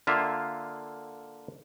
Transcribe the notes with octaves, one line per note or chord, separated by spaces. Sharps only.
D3 A#3 F4 E5